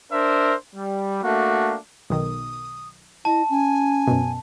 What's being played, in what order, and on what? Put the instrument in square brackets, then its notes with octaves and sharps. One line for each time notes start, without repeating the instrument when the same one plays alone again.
[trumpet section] D4 A#4 C5 E5
G3
A3 A#3 D4 F#4
[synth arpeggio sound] B1 D#3 [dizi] D#6
[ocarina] E4 [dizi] D#5 [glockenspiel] A5
[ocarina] C#4 [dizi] G#5
[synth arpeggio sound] F#2 B2